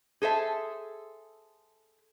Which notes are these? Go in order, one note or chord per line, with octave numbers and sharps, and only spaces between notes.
G#4 A4 C5 E5